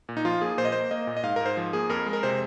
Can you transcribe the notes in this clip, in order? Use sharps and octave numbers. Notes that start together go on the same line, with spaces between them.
A#2
D#4
F3 F4
A#3 G#4
A#2 C5
D#5
A#3 C5
A#3 D#5
A#2
D#5
G#2 F5
G#2 A#4
C5
F3
A#3 G#4
F2 A#4
G#3
A#4
C3 C5